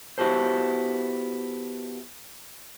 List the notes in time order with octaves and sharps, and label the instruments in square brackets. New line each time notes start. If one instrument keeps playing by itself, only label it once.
[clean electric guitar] B3 E4 F#4 G4 A4 C5